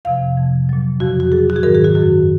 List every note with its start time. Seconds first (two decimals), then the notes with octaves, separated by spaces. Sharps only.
0.05 F2 C3 F3 F5
0.38 F2 C3 F3
0.69 A#2 F#3
1.00 F2 C#3 F3 F#4
1.20 F#4
1.32 A#2 F#3 G#4
1.50 F#4
1.56 G#4
1.63 G#2 D#3 F#3 A#4
1.75 G#4
1.84 F#4
1.95 F#2 D#3 F#3 F#4